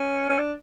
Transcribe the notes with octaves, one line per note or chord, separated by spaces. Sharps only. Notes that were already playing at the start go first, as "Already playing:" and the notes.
Already playing: C#4
C#4
D4